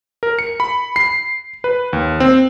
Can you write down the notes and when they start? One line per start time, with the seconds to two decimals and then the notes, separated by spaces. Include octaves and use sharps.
0.23 A#4
0.39 C#7
0.60 B5
0.96 C7
1.64 B4
1.93 D#2
2.20 C4